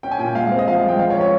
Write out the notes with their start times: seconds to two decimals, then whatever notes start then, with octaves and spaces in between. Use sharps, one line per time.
0.03 C#4 G5
0.11 G#5
0.19 A#2 G5
0.35 G#3 F5
0.52 C4
0.59 D#5
0.67 F3 F5
0.83 G#3
0.89 G5
0.99 F3 F5
1.10 C#5
1.15 C#4
1.21 C#5